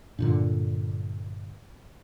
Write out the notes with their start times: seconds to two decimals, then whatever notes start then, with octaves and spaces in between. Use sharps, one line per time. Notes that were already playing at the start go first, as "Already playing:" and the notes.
0.19 G2 A#2 D3